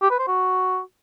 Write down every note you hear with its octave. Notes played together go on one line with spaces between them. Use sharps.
G4
B4
C5
F#4